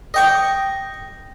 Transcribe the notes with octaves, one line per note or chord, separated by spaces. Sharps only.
D#5 G5 C#6